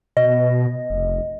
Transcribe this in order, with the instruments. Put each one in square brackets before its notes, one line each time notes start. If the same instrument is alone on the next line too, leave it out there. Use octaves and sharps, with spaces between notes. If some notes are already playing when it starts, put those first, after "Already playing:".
[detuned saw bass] B2 [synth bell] D#5
[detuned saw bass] F1